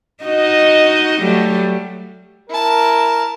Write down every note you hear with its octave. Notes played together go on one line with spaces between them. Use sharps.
D#4 F#4 D#5
F#3 G3 A3
E4 A#4 A5